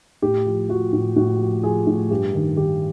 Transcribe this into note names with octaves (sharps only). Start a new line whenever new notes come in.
A2 G4
F3
F3 F#4
A2
A2 F#4
F3
F3 G#4
A2
G2 G4
D#3
D#3 G4